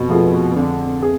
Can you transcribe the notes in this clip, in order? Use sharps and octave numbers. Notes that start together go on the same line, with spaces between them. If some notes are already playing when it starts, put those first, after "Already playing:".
Already playing: F2 B2
F3 A3 F4 G#4
F2 D3
G#4